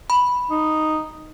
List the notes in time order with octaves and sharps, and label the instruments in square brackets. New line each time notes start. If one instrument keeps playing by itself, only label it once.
[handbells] B5
[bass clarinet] D#4